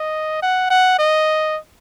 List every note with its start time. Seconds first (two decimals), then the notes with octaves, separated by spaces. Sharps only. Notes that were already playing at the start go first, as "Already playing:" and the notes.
Already playing: D#5
0.42 F#5
0.70 F#5
0.99 D#5